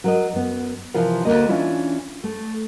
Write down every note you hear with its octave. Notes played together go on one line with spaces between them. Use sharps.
F#3 A#4 D#5
F#2 B3
C3 E3 F3 A#4 F5
D2 C#3 A#3 D#5
E3 C#4 D4 E4 F4
A3